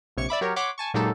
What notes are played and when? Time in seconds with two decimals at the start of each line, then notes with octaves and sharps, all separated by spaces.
0.17 A#1 C3 C#5 C#6 C#7
0.29 D5 E5 B5 D6
0.41 F#3 G4 A#4 C#5
0.56 C#5 F#5 C6 D6 B6
0.78 G#5 A5 C#6
0.94 A#2 F#3 G#3 D#4 G4 A4